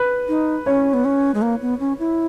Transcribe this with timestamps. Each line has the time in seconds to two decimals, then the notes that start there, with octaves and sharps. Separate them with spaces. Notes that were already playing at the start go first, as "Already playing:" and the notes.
Already playing: B4
0.28 D#4
0.66 C#4 C#5
0.94 B3
1.05 C#4
1.34 G#3
1.42 A#3
1.61 B3
1.80 C#4
1.99 E4